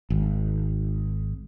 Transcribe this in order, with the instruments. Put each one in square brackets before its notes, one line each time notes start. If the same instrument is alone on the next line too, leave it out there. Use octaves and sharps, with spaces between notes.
[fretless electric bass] G#1